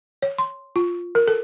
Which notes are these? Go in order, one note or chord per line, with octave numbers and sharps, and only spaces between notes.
C#5
C6
F4
A#4
A4